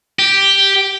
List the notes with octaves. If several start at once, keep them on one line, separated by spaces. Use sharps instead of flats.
G4